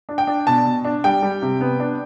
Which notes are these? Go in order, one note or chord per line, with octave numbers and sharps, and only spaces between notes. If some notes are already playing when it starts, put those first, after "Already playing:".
D4
G5
D4
B2 A5
B2
D4
G3 G5
G3
C3
B3
D4